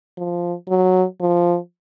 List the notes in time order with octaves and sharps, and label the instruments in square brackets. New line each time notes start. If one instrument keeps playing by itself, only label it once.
[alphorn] F3
F#3
F3